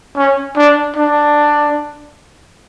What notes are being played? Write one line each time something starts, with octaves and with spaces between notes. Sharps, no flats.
C#4
D4
D4